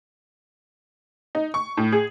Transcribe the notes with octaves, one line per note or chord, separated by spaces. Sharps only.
D#4
C#6
A2
G#4